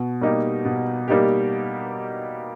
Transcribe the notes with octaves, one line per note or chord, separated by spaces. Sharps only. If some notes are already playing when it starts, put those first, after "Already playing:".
Already playing: B2
G3 A#3 D#4 G4
B2
G3 A#3 D#4 G4